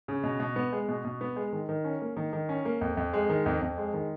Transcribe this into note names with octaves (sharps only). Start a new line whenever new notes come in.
C#3
B2
B2
B3
G#3
B2
B2
B3
G#3
D#3
D#3
C#4
A#3
D#3
D#3
C#4
A#3
F2
F2
G#3
D#3
F2
F2
G#3
D#3